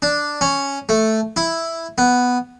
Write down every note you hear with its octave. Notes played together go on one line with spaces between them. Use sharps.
D4
C#4
A3
E4
B3